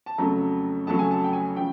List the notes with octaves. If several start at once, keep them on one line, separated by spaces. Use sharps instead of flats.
A5
F2 C#3 F#3 A3 A#5
F2 C#3 F#3 A3 A5
G#5
A5
G5
G#5
C#3 F3 G5